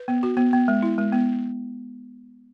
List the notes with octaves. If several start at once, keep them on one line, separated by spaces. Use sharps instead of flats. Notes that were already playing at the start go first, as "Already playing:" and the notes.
Already playing: B4
B3
F#4
B3
B3
G#3
E4
G#3
B3